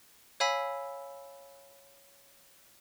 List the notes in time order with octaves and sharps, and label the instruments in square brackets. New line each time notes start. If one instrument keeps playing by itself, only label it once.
[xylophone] C#5 F5 G#5 B5 E6 B6